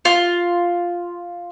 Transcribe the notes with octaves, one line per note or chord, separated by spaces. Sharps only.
F4